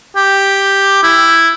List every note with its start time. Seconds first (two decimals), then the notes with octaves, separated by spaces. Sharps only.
0.16 G4
1.03 E4